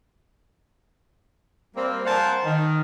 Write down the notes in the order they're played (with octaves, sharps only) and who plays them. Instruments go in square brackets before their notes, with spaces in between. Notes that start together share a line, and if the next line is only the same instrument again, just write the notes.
[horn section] G3 A#3 C4
A#4 C5 F5 F#5 G#5 A5
D#3